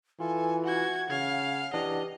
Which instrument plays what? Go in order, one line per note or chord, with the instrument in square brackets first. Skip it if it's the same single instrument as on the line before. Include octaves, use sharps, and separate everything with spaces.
[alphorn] E3 [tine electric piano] F4 [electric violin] A4 [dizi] G#5
[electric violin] F#4 G#6 [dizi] F#5
[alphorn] C#3 [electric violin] F5 [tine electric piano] G#6
[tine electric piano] E3 D4 [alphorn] G4 [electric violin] D#5